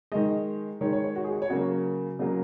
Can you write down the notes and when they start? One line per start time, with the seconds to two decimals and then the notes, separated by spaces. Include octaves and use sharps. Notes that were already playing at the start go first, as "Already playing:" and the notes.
0.12 D#3 G#3 D#5
0.81 D#3 G#3 C#5
0.93 C#5
1.04 C#5
1.16 F#4
1.24 G#4
1.32 F#4
1.42 C#5
1.50 C#3 F#3 A#3 F#4
2.19 C#3 F#3 A#3